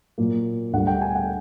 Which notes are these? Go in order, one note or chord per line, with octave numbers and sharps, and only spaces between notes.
A#2 F#3 A#3
D2 D3 G3 F#5
G5
G#5
F#5